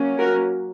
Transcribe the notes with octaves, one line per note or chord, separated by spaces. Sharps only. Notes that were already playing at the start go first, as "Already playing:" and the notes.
Already playing: F#3 A#3 C#4
F#4 A#4